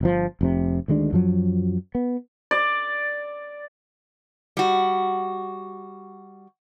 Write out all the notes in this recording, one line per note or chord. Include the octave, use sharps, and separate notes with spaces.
G1 C3 F3
F1 F2 A2 C3
D2 D#3 G#3 D4
F#2 F3 F#3
B3
D5
G3 F#4